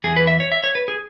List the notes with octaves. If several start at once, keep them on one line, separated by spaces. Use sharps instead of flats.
E2 E3 G#4
B4
E5
C#5
E5
C#5
B4
G#4